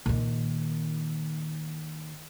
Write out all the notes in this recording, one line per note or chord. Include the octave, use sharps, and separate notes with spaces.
A#2 D#3